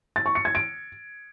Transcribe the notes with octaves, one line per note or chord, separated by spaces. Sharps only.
A6
C#6
C#7
G#6
D7